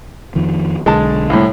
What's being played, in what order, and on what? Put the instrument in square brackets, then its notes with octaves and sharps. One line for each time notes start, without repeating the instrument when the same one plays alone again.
[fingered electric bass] F2 D#3 F3
[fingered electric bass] B1 D3 [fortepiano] G#3 A5
[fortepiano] C2 A2